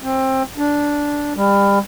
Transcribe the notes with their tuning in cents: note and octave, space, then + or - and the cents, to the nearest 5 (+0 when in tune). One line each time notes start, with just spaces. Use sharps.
C4 +20
D4 -10
G3 +30